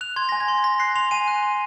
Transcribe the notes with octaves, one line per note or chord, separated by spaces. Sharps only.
F#6 F7
C6 G#6
G#5 A#6
G#6
C6
G#6
C6 A#6
F#6 C7
C6 F7
G#5 D#7
F#6
C6